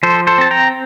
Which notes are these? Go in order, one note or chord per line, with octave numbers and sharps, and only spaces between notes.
F3 A4 C5
A4 C5
C4 A5
G5 A#5